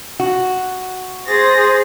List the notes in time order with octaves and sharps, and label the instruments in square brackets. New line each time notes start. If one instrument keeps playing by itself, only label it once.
[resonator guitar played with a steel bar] F#4
[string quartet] G#4 A6 A#6 [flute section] C5